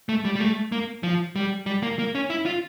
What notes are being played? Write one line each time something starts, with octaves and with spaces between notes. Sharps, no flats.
A3
G3
G3
A3
A#3
F3
G3
G3
A#3
A#3
C#4
E4
F4